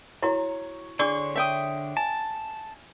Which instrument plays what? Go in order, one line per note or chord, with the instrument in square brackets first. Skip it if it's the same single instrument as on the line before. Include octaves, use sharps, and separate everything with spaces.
[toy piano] E4 F#4 A#5 [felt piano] C#5
[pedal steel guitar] D3 C6 C#6 [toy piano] D4 G#4 D5
[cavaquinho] E5 G5 D#6
[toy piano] G#5 [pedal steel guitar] A5